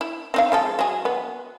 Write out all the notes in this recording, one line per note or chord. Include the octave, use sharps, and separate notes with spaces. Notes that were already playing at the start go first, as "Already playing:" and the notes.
E4
C4 D#4 F5
F3 G#3 A4
F#3 G#4
B3